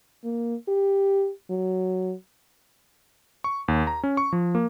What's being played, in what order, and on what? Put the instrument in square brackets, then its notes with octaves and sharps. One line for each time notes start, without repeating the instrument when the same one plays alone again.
[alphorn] A#3
G4
F#3
[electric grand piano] C#6
D#2
A#5
C#4
C#6
F3
A#3